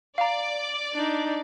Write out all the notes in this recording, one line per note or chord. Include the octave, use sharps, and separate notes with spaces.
D5 F5 A#5
D4 D#4